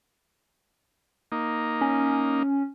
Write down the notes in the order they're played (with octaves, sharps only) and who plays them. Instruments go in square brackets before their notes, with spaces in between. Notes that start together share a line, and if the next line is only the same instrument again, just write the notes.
[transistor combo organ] A#3 D#4
[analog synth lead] C#4